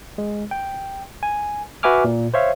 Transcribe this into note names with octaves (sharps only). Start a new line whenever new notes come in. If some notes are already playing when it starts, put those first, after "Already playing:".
G#3
G5
G#5
F#4 B4 E5 G#5 D6 F6
A#2
C5 C#5 E5 F5